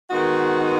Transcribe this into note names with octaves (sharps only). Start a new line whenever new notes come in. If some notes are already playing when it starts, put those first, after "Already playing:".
D#3 G#3 B3 D#4 F#4